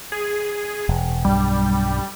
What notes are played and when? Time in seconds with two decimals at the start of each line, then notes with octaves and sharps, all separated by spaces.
0.12 G#4
0.89 E1
1.25 B1 G2 G3